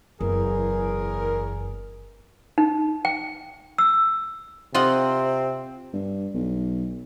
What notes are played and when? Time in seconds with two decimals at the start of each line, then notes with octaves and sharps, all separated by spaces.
0.21 F#1 E2 G#4 A#4
2.58 D#4
3.05 G5
3.78 E6
4.75 C3 C4 F4 D#5 F#5
5.94 G2
6.34 B1